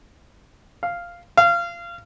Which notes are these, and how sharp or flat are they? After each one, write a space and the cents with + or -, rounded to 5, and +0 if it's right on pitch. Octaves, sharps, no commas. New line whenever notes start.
F5 -5
F5 -25